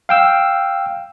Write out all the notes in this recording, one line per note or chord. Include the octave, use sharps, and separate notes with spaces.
F5 G5 E6